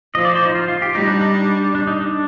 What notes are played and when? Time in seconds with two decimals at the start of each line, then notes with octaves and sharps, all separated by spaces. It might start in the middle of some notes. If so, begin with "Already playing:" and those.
0.15 F3 D#5
0.25 D5
0.35 C5
0.45 D#4
0.55 F4
0.68 F4
0.82 G4
0.94 G3 D#4
1.07 D4
1.21 D#4
1.35 D4
1.75 D4
1.87 D#4
2.01 D4